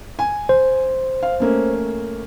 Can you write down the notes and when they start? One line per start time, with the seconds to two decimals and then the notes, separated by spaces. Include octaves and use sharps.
0.19 G#5
0.49 C5
1.23 F5
1.40 A3 A#3 C#4